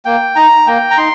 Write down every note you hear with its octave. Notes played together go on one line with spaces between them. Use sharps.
A#3 G5
D#4 A#5
A#3 G5
A#5
D#4 C6